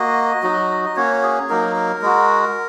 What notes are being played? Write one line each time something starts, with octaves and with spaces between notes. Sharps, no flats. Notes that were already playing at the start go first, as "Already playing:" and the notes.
Already playing: A#3 F#4 D#5
F#3 D#4 F#4
D#5
A#3 C#4 F#4 C#5
G#4
F#3 A#3 D#4 A#4
A#4
G#3 F#4